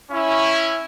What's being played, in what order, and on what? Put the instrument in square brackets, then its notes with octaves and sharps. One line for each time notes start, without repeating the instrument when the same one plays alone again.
[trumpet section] C#4 E4